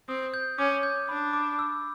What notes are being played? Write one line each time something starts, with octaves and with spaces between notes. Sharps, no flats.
C4 D#6
G6
C#4 D6
G6
D4 B5
D6
E6